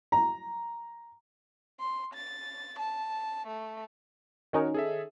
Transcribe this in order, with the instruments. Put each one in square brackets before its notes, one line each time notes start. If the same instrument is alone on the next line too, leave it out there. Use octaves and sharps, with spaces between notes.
[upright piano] A#5
[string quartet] C6
A6
A5
A3
[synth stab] D#3 C#4 D#4 [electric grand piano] F#4 A#4 C#5
[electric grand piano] G#4 A4 E5